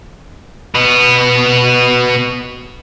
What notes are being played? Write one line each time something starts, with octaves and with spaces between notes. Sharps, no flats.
B2 B3